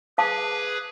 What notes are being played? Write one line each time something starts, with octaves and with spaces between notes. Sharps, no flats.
G#4 B4 F5 A5 D6